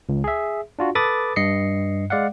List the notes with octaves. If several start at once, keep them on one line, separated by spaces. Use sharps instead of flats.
C#2
G#4 E5
D4 F4 F#4
A4 B4 B5 D6 D#6 A6
G2 D#5 C7 C#7
G#3 D5 F5 F#5